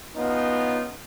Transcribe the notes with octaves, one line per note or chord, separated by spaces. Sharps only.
B3 C#4 D#4 F4